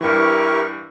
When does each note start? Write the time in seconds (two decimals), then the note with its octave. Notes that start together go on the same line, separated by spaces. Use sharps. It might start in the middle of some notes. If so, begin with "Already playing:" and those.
0.01 G2 E3 E4 G4 A#4 C#6